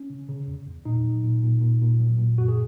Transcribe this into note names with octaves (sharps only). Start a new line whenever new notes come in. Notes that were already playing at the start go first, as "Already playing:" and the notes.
Already playing: C#4
C#3
C#3
E2
E2
A#2 D#4
F#3
A#2
A#2
A#2
A#2
F#3
A#2
F#2 F#4
G#4